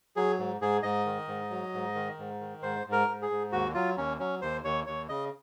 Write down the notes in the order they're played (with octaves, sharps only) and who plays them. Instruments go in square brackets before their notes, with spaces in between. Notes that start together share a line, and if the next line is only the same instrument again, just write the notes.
[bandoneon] F#3 G#4
G#2
G#2 G#4
G#2 D#5
D#3
G#2
F#3
G#2
D#3
G#2
D#3
G#2 C5
G#2
A#4
G#2
G#4
G#2
D#2 F#4
F#3 F4
D#2 C#4
F#3 C#4
D#2 C5
D#2 C#5
D#2 C#5
C#3 D#5